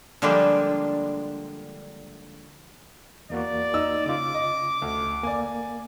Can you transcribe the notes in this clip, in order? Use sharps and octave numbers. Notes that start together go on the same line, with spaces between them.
D3 F3 G3 G#3 A#3 D4
E2 A#3 F#4 D5
D#4 E6
C#3 F4 D6
D#5
D2
A#3 D5 G#5